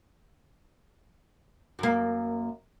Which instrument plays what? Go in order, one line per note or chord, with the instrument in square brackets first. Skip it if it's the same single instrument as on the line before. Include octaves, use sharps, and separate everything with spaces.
[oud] F#2 A#3